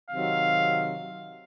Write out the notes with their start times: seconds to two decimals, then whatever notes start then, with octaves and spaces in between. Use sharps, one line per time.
0.10 C3 D#3 F#3 C4 F5